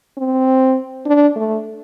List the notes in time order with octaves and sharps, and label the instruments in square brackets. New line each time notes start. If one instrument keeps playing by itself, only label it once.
[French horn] C4
D4
A3